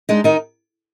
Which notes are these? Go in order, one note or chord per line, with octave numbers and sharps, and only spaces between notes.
G#3 D4 D#4
D#3 D#4